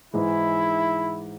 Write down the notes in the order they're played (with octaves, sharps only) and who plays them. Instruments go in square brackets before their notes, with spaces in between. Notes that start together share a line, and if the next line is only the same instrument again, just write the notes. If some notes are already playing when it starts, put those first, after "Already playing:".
[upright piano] G#2 E3 G#3 D#4 [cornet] E4